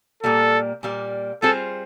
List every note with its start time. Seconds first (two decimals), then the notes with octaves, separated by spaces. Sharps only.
0.23 A#2 G3 A#3 A4
0.83 A#2 G3 A#3
1.42 G3 C4 F4 G#4 A4 C5